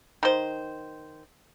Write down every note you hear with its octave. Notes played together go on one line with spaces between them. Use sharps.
D#3 C5